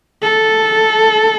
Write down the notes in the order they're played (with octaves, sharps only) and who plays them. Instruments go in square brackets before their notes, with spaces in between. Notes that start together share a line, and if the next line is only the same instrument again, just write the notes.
[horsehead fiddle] A4